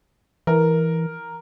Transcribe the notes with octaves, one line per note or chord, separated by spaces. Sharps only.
E3 A#4